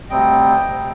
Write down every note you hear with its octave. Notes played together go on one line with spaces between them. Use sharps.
D2 C3 G3 C4 D#5 G5
D2 C3 G3 C4